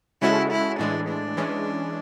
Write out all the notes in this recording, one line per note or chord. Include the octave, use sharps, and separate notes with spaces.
C#3 G#3 C#4 E4 F#4 A4
E4
A2 E3 G#3 D4
D4
E3 G#3 C#4